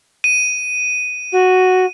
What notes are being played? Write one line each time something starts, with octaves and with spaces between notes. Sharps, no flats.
D#7
F#4